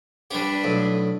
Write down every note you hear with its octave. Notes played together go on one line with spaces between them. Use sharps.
G3 D4 G4 B4
B1 A2